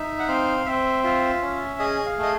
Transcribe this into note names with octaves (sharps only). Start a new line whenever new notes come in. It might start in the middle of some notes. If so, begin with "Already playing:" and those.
Already playing: D#4 E5
F#5
C4 F5
C4 E5
F4 E5
C#4
G#4 D#5
F5
A3 D#5